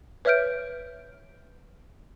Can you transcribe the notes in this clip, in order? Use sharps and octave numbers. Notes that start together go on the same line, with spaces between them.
B4 C#5 E5 F6 G6 D7